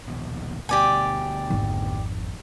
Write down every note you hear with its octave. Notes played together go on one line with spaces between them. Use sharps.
A#1 D#2 B2
D2 B2 G4 D5 G#5
G#1 F2